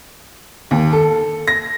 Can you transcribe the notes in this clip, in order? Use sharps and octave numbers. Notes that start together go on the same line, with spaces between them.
D#2
A4
A#6